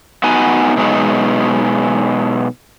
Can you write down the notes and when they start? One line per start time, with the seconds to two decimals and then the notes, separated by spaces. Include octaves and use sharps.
0.24 B3 D#4 F#4 G#5
0.77 B2 F#3 G#3 D#4